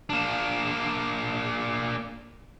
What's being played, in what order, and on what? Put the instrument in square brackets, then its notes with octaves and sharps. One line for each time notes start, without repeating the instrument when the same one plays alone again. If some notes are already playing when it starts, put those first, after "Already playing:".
[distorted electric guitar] A#3 D4